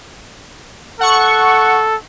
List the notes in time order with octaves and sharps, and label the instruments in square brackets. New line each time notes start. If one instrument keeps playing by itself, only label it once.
[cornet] A4 [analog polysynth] F#5 C#6